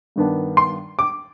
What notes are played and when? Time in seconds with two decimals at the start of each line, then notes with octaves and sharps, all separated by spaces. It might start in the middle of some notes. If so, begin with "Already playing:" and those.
0.16 G2 D#3 B3 D4
0.57 C6
0.99 D6